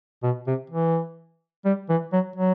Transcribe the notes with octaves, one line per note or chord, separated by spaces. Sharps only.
B2
C3
E3
G3
E3
F#3
F#3